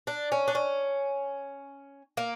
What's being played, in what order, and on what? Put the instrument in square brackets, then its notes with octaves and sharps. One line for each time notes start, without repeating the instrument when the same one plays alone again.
[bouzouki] D4
C#4
D4
C#4
A#3